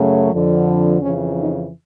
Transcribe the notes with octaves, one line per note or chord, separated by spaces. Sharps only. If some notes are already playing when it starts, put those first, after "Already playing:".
Already playing: F#2 C#3 F#3 A3
F2 D3 F3
F2 C#3 E3 C#4
D#4